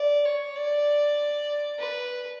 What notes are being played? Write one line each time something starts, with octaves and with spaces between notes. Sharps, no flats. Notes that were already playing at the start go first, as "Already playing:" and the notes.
Already playing: D5
C#5
D5
B4